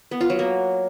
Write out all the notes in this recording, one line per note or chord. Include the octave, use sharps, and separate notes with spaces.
B3
F4
F#3
A#3